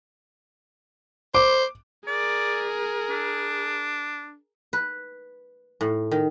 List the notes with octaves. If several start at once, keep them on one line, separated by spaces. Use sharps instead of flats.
C5 D6
G#4 A#4 D5
D4
B4
A2
D#3